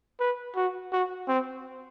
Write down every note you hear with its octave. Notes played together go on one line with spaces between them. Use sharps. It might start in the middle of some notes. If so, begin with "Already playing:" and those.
B4
F#4
F#4
C4